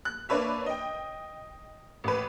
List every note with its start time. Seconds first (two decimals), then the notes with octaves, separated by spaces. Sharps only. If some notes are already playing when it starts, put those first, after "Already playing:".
0.05 F#6
0.29 A#3 D4 B4 C#5 E5
0.66 D#5 G5
2.04 A1 B4